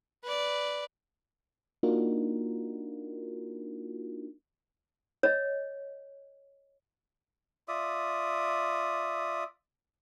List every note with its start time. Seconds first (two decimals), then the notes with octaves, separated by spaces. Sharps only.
0.24 B4 D5
1.83 A#3 D4 D#4 F4 F#4 A#4
5.23 C#5 D#5
7.68 F4 D5 E5 D#6